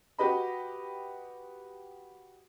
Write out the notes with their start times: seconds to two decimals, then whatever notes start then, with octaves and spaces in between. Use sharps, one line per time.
0.18 F#4 G4 B4 D#5 B5